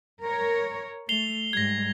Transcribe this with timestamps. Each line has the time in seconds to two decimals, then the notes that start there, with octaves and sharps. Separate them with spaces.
0.24 A#4 C#5
1.09 A3 C7 F7 G7
1.53 G#2 G3 G#6 A#6